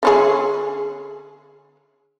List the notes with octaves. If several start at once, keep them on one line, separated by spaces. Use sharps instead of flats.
D3 C#4 G#4